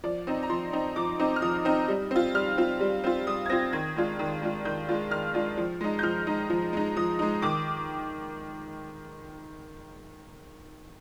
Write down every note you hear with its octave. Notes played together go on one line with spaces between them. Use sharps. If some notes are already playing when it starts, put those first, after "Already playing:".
F3 D5
C4 D#4
A#5
F3 C6
C4 D#4
F3 D6
C4 D#4
F6
F3 D#6
C4 D#4
G3
C4 F4
G3 F6
C4 F4
G3
C4 F4
G3 D#6
G#6
C4 F4 A#6
D#3 G#6
G#3 D4 F4
D#3
G#3 D4 F4
D#3 G6
G#3 D4 F4
D#3 F6
G#3 D4 F4
F3
G#3 D#4
G6
F3 F6
G#3 D#4
F3
G#3 D#4
F3 D#6
G#3 D#4
D#3 D6